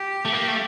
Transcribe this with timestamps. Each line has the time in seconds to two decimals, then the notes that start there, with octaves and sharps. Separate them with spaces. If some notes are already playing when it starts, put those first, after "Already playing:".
Already playing: G4
0.25 A3
0.33 A#3
0.47 A3